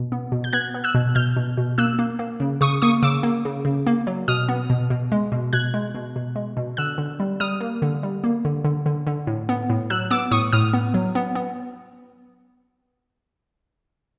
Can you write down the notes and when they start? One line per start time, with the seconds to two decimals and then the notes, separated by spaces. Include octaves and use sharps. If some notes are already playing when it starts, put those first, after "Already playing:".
Already playing: B2
0.12 B3
0.32 B2
0.44 G6
0.53 B3 F#6 G#6
0.74 B3
0.84 E6 F#6
0.95 B2
1.15 B2 F6 G6
1.36 B2
1.58 B2
1.78 A#3 E6 F#6
1.99 A#3
2.19 A#3
2.40 C#3
2.61 C#3 C#6 D#6
2.82 A#3 C#6 D#6
3.03 C#3 D6 E6
3.23 A#3
3.45 C#3
3.65 C#3
3.87 A#3
4.07 F#3
4.28 B2 D#6 F6
4.49 B3
4.70 B2
4.90 B2
5.12 G#3
5.32 B2
5.53 B2 F#6 G#6
5.74 G#3
5.95 B2
6.16 B2
6.36 G#3
6.57 B2
6.77 D3 E6 F#6
6.98 D3
7.20 G3
7.40 G3 D#6 F6
7.60 A#3
7.82 D3
8.03 G3
8.24 A#3
8.45 D3
8.64 D3
8.86 D3
9.07 D3
9.27 A2
9.49 B3
9.70 A2
9.90 F#3 E6 F#6
10.10 B3 D6 E6
10.31 A2 C#6 D#6
10.53 A2 D#6 F6
10.73 B3
10.94 F#3
11.15 B3
11.35 B3